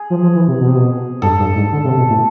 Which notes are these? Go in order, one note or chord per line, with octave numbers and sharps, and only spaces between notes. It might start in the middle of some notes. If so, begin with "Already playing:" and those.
Already playing: G#4
F3
F3
E3
C3
B2
C3
B2
G2 A4
G2
G#2
D3
C3
B2
A2